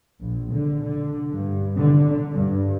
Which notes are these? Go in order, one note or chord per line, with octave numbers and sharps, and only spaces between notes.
A#1
D3
D3
G2
D3
G2